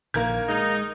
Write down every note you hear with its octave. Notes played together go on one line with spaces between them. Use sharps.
A#1 D#3 A#3 A#4 G#6
G#3 D#4